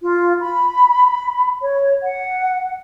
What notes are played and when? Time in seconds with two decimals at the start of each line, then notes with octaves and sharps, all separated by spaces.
0.02 F4
0.41 B5
1.62 C#5
2.03 F#5